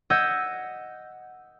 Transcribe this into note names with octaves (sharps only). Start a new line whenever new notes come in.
D#5 F#5 E6 G6 G#6 B6